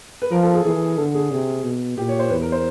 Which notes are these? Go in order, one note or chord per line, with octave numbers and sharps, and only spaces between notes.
B4
F3 A#4
A4
G#4
E3 G#4
D3 A4
G#4
C3 G#4
B2
A#2 G4
C#5
C5
E2 B4
A#4
C5